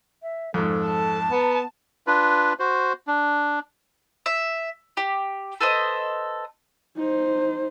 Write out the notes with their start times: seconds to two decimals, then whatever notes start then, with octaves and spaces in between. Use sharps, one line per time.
0.23 E5
0.54 F2 G#2 A4
0.86 A5
1.31 B3 A#5
2.07 D4 F4 B4
2.59 F#4 C5
3.07 D4
4.26 E5
4.97 G4
5.61 A4 B4 C5 D#5
6.97 D#4 C5